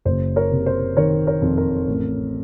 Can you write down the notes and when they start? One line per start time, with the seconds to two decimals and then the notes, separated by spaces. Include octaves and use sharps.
0.05 F#1 C5
0.36 A#4 C#5
0.51 C3
0.66 C5
0.97 D#3 A#4 C#5
1.27 A#4 C#5
1.42 F2
1.57 A#4
1.88 A1